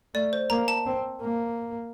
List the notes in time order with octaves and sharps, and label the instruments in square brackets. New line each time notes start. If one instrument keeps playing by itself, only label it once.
[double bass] A3 [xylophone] D5
[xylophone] C5
[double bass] A#3 [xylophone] A#5
[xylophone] A5
[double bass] C4
A#3